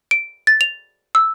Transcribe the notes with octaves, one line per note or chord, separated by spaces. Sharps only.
D7
A6
F7
E6